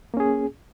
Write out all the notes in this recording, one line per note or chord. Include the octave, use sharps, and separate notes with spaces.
A#3 C#4 G#4